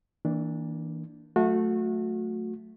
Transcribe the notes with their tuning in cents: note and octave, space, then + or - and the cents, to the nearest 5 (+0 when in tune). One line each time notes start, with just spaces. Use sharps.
E3 -35 A#3 +0 D4 +0
F#3 +0 A3 +0 F#4 -30